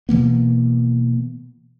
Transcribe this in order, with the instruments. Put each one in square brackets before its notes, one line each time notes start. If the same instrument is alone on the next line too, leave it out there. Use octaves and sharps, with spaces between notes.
[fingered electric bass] B2 E3 A#3 B3